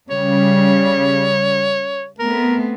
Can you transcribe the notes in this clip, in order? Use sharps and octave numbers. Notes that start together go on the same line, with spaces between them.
C#3 G3 C#5
A3 B3 C4 A#4